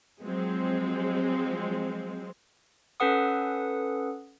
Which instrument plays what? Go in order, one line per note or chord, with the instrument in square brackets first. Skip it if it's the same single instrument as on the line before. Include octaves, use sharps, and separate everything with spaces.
[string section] F3 F#3 G#3 C4
[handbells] C#4 A4 B4 F#5 D#6